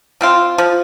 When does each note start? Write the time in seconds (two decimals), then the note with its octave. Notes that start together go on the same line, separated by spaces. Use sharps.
0.21 F3 C4 F4
0.58 F3